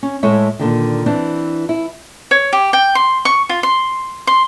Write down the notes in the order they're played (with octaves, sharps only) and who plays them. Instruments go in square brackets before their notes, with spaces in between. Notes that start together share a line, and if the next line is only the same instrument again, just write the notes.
[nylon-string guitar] C#4
A2 G#3 A3 C#5 E5
A#2 D3 D#3
E3 C4 D4 E4
E4
[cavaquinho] C#5
G4
G5
C6
C#6
F4
C6
C6